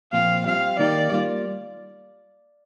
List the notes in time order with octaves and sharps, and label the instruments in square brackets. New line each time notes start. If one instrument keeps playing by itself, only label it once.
[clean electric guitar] A#2 F3 C4 F4 [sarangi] F5
[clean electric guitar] G3 C4 F4 [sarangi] F5
[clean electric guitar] D#3 A#3 D#4 G4 [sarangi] D5
[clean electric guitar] G3 A#3 F4